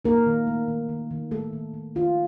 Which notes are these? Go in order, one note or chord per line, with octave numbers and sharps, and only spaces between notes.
A#3 D#4 A#4
D#3
A3
D#3
D#3
D#3
D#3 A3 A4
D#3
D#3
D#3 F4